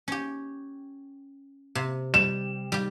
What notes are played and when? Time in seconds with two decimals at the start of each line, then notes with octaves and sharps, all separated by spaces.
0.08 C#4 G4
1.75 C3
2.14 G3 E7
2.72 G3 G4